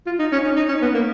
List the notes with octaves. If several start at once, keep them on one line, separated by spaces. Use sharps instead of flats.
F4
D#4
C#4
D#4
D#4
C#4
B3
A#3